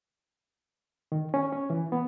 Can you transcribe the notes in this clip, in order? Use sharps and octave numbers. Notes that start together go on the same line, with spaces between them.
D#3
C#4
C#4
E3
B3